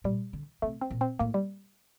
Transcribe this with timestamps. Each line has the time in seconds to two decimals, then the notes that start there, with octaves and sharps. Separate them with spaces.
0.04 A#2 G3
0.33 D3
0.62 C3 A3
0.81 C4
0.91 A#2
1.01 C4
1.19 A2 A#3
1.34 G3